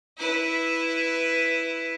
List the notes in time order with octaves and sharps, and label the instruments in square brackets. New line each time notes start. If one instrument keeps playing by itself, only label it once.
[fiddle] E4 B4